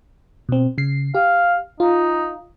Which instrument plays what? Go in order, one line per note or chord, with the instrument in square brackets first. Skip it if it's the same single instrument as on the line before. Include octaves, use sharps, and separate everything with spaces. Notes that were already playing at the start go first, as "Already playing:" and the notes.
[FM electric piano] B2 C4
C#3 C7
[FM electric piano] G4 [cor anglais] F5
[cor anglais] D#4 [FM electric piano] F4